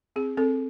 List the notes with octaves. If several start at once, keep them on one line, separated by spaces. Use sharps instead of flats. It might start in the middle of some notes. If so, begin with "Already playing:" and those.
C4 G#4
C4 A4